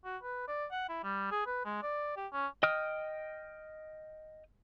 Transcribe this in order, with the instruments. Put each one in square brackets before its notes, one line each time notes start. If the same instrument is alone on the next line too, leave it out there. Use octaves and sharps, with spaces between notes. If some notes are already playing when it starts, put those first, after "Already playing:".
[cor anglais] F#4
B4
D5
F#5
E4
G3
G#4
B4
G#3
D5
G4
C#4
[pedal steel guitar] D#5 G5 D#6 F6